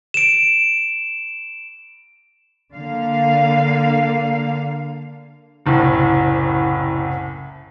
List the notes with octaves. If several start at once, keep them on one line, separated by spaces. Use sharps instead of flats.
D7 E7
D3 A#3 F5
F#1 C2 A2